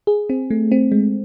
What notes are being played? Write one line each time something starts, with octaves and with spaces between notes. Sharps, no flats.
G#4
C4
A3
C4
G#3